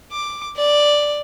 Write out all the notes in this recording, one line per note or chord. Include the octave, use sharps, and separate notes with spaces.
D6
D5